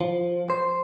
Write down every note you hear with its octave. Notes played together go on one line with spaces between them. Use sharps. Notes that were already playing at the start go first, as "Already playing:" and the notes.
F3
C5